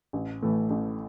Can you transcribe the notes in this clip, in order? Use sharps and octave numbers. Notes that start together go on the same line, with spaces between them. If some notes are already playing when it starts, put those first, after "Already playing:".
A1
A2 E3 A3
A1